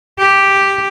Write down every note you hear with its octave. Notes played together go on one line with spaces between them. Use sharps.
G4